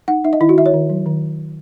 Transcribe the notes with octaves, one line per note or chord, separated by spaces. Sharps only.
D#4 F#5
D#4 E5
D#5
D#3 E4
F#4
D#3 E5
C#5
D#3
F#3
D#3